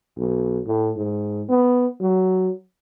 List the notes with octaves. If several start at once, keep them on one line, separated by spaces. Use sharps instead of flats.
B1
A2
G#2
B3
F#3